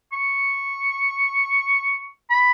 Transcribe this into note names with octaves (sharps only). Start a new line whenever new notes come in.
C#6
B5